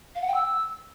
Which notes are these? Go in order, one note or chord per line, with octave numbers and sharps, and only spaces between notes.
F5
F#5
G5
E6